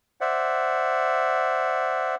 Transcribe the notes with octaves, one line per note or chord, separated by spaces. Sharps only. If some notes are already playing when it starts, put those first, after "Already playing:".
C5 D5 E5 F#5